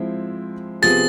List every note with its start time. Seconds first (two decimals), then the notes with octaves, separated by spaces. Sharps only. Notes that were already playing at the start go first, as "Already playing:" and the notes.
Already playing: F3 G#3 C4 E4
0.82 C3 F3 B3 F4 G#4 A6